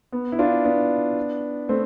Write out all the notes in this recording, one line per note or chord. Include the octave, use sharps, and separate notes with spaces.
B3
E4
D4 F4
B3 D4
A3 C4